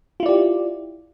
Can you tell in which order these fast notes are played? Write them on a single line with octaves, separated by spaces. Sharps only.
F4 E4 D5 G4